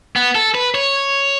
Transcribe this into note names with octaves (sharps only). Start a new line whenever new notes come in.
B3
A4
B4
C#5